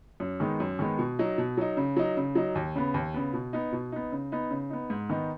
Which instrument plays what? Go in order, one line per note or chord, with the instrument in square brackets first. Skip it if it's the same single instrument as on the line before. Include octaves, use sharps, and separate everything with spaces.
[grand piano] F#2
D#3 G#3 B3 D#4
F#2
D#3 G#3 B3 D#4
B2
F#3 D#4
B2
F#3 D#4
C#3
F#3 D#4
C#3
F#3 D#4
D#2
C#3 B3
D#2
C#3 B3
B2
B3 D#4
B2
B3 D#4
C#3
B3 D#4
C#3
B3 D#4
G#2
D#3 B3 D#4